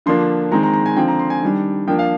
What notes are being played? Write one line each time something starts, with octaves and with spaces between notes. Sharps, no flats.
D3 F3 A#3 D4 C6
D#3 G#3 C4 A#5
A#5
A#5
G#5
D3 F3 C4 G5
A#5
C6
G#5
D#3 G3 D4
F3 A#3 D4 G5
F5